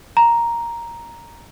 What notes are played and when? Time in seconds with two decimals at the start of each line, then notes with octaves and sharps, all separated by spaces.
0.17 A#5